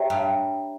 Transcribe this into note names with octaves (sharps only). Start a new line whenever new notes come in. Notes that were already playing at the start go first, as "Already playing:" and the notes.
Already playing: G4 C#5 E5 G5 A#5
G2